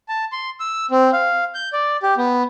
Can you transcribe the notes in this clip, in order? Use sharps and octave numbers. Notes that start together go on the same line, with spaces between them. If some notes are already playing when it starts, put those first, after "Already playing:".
A5
C6
E6
C4
F5
G6
D5
G4
B3